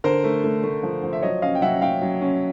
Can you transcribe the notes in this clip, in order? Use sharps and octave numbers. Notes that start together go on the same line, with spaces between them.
D3 A#4 C5
A3
A3
A3
F3
F3
E5
F#3 C#5 D#5
C#4 D#5 F5
G5
F#3 E5 F#5
F#3 F5 G5
F#3
C#4